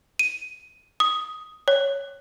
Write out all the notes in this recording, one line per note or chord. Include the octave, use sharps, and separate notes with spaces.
D#7
D#6
C#5